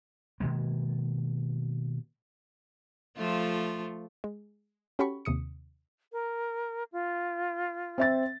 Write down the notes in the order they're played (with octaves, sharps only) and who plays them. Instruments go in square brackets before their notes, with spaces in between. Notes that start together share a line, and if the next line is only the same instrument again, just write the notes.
[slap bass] B2 D#3 G#3 A#3
[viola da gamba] F3 A3 F4
[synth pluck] G#3
C#4 F#4 G4 A4 B5 C#6
D#2 C3 D#6 C#7
[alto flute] A#4
F4
[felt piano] C4 E5 A6